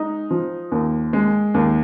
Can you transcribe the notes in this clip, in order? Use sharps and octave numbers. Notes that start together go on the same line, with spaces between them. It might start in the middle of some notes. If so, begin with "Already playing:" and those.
Already playing: G#3 D#4
F3
D#2
G#3
D#2